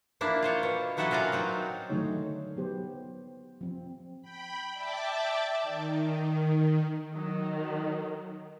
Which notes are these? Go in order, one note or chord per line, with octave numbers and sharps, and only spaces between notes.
F3 A#3 D4 E4
F4 C5 C#5
B2 C#5
C3 F#3 E4 F#4 A4 D#5
C#4 D4 F4 F#4 A#4
F#3 C4 D#4
D3 D#3 F#3 A3 D#4 C#5
F#3 B3 G4 C5
F3 C4
G5 B5
D5 E5 G5 A5 D6
D#3
D#3 F#3